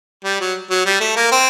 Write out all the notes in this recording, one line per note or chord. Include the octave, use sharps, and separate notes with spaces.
G3
F#3
F#3
G3
A3
A#3
C4